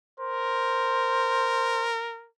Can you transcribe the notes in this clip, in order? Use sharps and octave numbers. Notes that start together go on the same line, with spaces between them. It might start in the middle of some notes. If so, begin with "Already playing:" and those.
A#4 C5